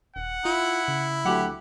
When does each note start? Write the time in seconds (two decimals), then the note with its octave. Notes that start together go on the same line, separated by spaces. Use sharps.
0.16 D#1 F#5
0.45 E4 F4
0.88 C#3
1.25 D2 F#3 G4 F#5